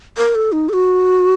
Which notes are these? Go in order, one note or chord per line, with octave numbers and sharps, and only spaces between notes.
A#4
A4
D#4
A4
F#4